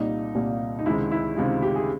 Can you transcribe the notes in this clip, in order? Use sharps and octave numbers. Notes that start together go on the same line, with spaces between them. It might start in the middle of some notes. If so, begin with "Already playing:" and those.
Already playing: C2 A#2 G3 A#3 D#4
C2 A#2 G3 A#3
D#4
C#2 C3 D#3 G#3 E4
E4
C#2 C3 D#3 G#3 F4
G4
G#4